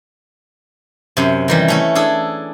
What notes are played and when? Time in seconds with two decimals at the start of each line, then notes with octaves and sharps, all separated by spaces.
1.17 F#2 C3
1.48 D#3 E3 G3
1.68 A3 C#4 E4
1.95 D4 G#4 A4